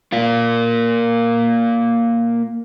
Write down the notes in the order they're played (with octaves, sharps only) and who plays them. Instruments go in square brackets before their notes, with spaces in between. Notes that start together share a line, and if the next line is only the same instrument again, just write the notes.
[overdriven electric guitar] A#3 F4